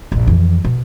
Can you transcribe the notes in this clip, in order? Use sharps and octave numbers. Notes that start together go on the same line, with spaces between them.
A#1 G2
F2 E3
B2